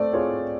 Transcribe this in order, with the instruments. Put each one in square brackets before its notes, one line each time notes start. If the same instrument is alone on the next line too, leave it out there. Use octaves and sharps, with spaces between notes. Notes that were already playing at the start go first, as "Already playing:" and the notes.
Already playing: [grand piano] A3 C4 [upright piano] D5
[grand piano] C4 F4 G#4 C#5